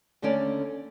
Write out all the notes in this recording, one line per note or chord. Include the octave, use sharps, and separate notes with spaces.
D#2 D3 A3 C#4 D5